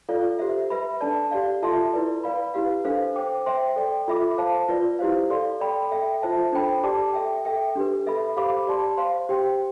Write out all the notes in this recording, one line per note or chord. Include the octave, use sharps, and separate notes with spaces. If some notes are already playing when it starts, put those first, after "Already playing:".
F4 A4 D5 F5
G4 C5 E5
B4 E5 B5
D4 A4 D5 A5
G4 D5 F5
F4 A4 E5 A5 C6
E4 B4 D5
B4 D5 F5 B5
E4 G4 B4 F5
D4 A4 C5 F5
C5 G5 D6
C5 E5 G5 C6
A4 D5 G5
F4 A4 E5 B5 D6
C5 F5 A5
F4 B4 D5
E4 G4 C5 F5
A4 D5 F5 C6
A4 D5 G5 B5
A4 E5 G5
F4 C5 E5 A5
D4 A4 C5 G5 B5
G4 D5 A5 D6
A4 E5 G5
A4 E5 G5
D4 G4 B4
A4 E5 B5
G4 C5 F5 B5 D6
G4 D5 A5 C6
C5 F5 C6
G4 C5 G5